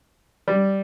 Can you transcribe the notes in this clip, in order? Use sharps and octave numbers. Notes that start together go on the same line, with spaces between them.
G3